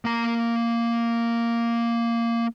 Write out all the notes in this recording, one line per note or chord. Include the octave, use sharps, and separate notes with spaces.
A#3 A#5